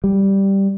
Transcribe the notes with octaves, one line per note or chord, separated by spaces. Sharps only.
G3